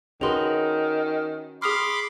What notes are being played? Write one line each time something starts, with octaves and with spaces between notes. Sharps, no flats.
D#3 C#4 F#4 G#4 B4 C6
G#4 B5 C6 D6 D#6 F6